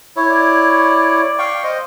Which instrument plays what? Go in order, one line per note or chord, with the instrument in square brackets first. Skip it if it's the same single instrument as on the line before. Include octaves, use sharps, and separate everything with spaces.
[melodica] E4 C#5
[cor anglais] D5
[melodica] F5 G5 C#6
C5 D#5